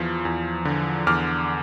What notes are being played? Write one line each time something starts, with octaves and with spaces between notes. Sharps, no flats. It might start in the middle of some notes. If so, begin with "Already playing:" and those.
Already playing: E2 F3
E2
D3
E2 D6 F6